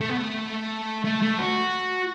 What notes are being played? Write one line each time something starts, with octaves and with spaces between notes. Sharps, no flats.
A3
B3
A3
A3
A3
F#4